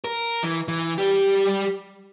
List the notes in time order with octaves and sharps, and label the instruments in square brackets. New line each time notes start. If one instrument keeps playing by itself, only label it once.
[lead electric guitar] A#4
E3
E3
G3 G4